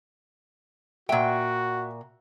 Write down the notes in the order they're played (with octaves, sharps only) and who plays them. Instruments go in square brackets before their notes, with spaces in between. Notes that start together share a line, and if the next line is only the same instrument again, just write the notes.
[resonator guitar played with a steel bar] A#2 G5 [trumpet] F#4 [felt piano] E5 F#5